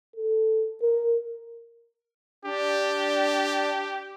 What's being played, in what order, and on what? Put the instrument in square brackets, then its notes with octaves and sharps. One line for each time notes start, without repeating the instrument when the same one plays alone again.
[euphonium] A4
A#4
[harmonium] D4 [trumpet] G4